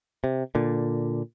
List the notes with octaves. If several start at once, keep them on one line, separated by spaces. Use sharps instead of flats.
C3
A#2 D3